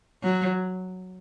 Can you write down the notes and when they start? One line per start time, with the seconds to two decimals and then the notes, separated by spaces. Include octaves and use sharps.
0.23 F#3